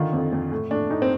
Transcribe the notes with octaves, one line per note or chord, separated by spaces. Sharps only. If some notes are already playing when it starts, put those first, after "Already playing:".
Already playing: D3 D#3 F4
F2
F2
A2
A2 D4
A2 D#4
C4